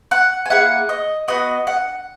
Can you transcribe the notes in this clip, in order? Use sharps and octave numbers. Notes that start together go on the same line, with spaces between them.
F#5
G#5
A#3 E4 G#4 F#5
D#5
B3 F#4 D#5
F#5